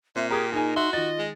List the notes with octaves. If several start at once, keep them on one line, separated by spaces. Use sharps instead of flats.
A#2 C4 E5
G4 G#4 A#4 D#6 G#6
D#4 G#4 A#4 G#5
F#4 E5 C6
D#3 F4 D#5 A6
G#3